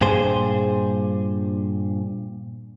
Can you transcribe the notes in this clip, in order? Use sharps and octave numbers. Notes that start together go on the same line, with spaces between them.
G2 A#2 G#4 C5